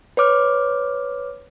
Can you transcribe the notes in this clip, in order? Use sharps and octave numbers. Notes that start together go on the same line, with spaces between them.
B4 C#5 D6 F6